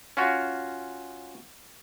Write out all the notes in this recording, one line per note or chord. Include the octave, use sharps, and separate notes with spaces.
C#4 F4 F#4